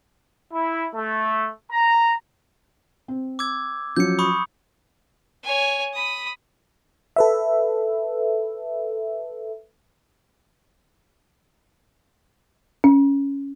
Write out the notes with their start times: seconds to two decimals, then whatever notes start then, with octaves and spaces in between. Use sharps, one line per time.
0.52 E4
0.95 A3
1.71 A#5
3.08 C4
3.39 D6 E6 G#6
3.96 F3 F#3 C#4 G6 C#7
4.19 B5 C#6 D#6
5.44 C#5 G#5
5.93 B5 D#6
7.16 A4 B4 E5
12.84 C#4